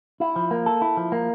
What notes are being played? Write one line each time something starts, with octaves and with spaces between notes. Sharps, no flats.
E4
F3
A#3
A4
E4
F3
A#3